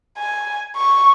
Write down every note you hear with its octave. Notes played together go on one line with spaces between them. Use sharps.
G#5
C#6